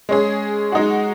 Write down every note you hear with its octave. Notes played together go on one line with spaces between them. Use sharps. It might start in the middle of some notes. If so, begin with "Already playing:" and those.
G#3 C#4 G#4
G#3 D#4 F#4